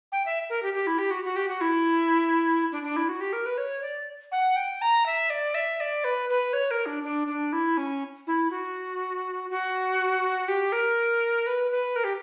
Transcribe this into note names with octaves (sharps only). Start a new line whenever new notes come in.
G5
E5
A#4
G4
G4
E4
G4
F#4
F#4
G4
F#4
E4
D4
D4
E4
F#4
G4
A#4
B4
C#5
D5
F#5
G5
A#5
E5
D5
E5
D5
B4
B4
C#5
A#4
D4
D4
D4
E4
C#4
E4
F#4
F#4
G4
A#4
B4
B4
A#4
G4